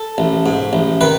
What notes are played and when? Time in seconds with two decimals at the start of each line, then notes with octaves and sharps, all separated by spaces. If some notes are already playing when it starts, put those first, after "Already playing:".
Already playing: A4
0.18 A1
0.46 G#2
0.73 A1
1.01 D#3 B4